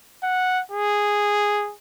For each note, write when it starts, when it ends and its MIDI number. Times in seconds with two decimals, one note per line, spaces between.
0.23 0.61 78
0.71 1.73 68